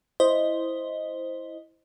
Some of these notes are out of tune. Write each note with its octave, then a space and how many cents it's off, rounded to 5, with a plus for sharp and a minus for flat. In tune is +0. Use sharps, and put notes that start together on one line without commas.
E4 +0 C5 +0 D#5 +0